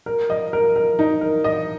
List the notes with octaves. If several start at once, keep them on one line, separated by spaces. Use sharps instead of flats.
A#4
D#5
A#4
A#4
D#4
A#4
D#5